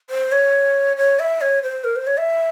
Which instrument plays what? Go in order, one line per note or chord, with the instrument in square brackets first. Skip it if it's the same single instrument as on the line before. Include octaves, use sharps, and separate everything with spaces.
[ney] C5
C#5
C#5
E5
C#5
C5
A#4
C5
C#5
E5